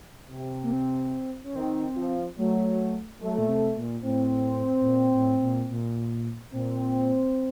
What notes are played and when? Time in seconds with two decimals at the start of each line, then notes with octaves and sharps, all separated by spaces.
0.31 C3
0.63 A#3
0.73 C4
1.44 C#4
1.55 D#3 C4
1.96 F3
2.37 F#3 A3
3.21 F#3 A3
3.38 A#2
3.49 C3
3.77 A#2
4.04 A2 C4
4.81 A2
4.88 A#2
5.15 A2
5.42 A#2
5.70 A#2
6.53 A#2 C4